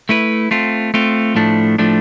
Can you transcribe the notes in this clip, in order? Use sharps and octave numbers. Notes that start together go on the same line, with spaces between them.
A3 E4 B4
A3 C4 F4
A3 C4 F4
A2 F3 A3 D4
A2 F3 A3 D4